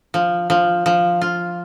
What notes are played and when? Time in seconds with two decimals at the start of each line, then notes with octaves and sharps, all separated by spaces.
0.14 F3
0.50 F3
0.86 F3
1.22 F4